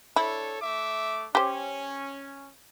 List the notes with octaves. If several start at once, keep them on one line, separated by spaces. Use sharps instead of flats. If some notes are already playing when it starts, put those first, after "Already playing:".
D4 E4 A4 C#5
A3 E5 D6
C#4 G4 C5